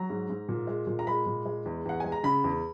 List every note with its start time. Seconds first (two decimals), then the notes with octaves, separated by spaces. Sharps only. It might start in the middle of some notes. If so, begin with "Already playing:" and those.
Already playing: F#3 A#5
0.10 G#2
0.29 G#2
0.49 A#2
0.67 G#3
0.87 A#2
0.99 A#5
1.07 G#3 B5
1.26 A#2
1.46 G#3
1.65 E2
1.85 E2 F#5
2.00 G#3 G#5
2.12 A#5
2.23 C#3 B5
2.44 E2